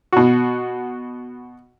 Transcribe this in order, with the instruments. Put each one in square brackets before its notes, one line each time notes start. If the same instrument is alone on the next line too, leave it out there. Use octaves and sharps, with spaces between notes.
[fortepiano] B2 F#4